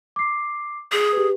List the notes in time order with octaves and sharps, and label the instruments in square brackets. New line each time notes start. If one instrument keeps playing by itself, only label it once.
[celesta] D6 C7
[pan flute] G#4
[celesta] G4 B4